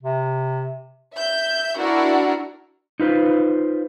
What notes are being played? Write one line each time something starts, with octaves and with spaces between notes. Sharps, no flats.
C3
E5 G6
D4 E4 F#4 A#4
D#4 F4 B4 C5